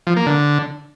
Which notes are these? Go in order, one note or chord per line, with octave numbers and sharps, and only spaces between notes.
F3
A#3
D3